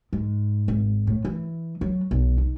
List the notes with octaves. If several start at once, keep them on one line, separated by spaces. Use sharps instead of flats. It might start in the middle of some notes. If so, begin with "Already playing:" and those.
G#2
G#1
A2
E3
F#3
B1
D#4